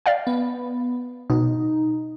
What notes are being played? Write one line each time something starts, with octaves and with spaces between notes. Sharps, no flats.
D5 F5 G5
B3
B2 D#4